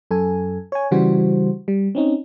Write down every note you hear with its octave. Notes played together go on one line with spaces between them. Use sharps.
F#2 A4 G#5
C#5 G#5
C#3 E3 G3 F#4 C5
G3
C4 C#4 D#4